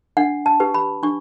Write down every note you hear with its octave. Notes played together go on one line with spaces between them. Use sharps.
D4 F#5
A5
G4 B4
B5
D4 C#6